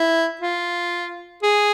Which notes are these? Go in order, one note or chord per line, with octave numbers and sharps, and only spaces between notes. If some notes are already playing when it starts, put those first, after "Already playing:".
Already playing: E4
F4
G#4